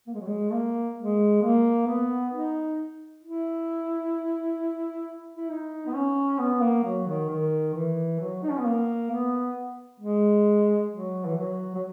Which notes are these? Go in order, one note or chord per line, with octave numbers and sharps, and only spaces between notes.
A#3
G#3
F#3
G#3
A#3
G#3
A#3
B3
D#4
E4
E4
D#4
B3
C#4
B3
A#3
F#3
D#3
D#3
E3
F#3
D#4
C#4
B3
A#3
B3
G#3
F#3
E3
F#3
F#3